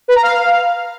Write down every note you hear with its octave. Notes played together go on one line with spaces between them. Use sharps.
B4
A#5
F5